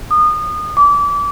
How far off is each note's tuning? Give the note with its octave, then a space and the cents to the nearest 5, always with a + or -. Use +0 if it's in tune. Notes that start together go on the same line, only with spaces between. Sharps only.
D#6 -30
D6 -30